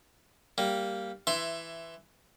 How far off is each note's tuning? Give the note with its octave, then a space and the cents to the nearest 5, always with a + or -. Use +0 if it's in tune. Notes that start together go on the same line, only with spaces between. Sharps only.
G3 +0 A#3 -5
E3 +5 E5 +20 C6 +0